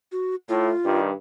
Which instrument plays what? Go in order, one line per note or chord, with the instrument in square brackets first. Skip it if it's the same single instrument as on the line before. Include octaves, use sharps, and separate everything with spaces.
[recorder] F#4
[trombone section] A2 [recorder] F4
[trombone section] G2 D#3 G3